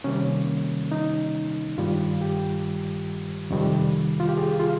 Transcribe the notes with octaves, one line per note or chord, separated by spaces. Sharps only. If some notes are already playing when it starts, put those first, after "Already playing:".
C3 D#3 G3 A#3 C#4
D#4
G2 D#3 G3 F4
G4
F2 C3 D#3 G3
F4
G4
G#4
F4